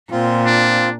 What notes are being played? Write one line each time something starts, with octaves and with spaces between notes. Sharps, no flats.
A#2 C4 F4
D4